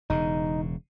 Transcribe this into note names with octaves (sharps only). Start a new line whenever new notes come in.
E1 C#3 D#4